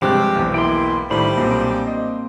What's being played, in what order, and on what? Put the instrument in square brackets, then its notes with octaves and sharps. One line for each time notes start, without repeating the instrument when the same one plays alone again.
[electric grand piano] G2 C3 G#3 [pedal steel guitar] F3 C5 F#6 [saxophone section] C4 G4
[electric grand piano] B1 E2
[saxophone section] A#3 E4 [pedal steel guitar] G5 C6
[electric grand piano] A2 D#3 [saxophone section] G3 D4 C5 [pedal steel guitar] B5
[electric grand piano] B1 A#2 [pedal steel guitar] A#3 C4
[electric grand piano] D#5